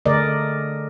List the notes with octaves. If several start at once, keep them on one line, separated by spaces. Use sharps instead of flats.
D3 A3 G#4 A#4 D5 D#5